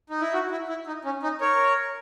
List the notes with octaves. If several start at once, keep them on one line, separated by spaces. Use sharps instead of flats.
D#4
E4
F#4
E4
E4
D#4
C#4
D#4
A#4 C#5